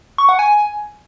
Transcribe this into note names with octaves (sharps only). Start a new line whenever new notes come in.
C#6
F#5
G#5